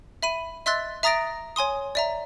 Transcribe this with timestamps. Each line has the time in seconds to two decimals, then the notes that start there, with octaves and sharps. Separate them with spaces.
0.23 E5 B5 D#7
0.66 D#5 E5 C6 E6 F#6 A6
1.03 E5 A#5 D#6 A6 A#6 D7
1.56 C#5 G#5 C6 D#6
1.95 D5 E5 A#5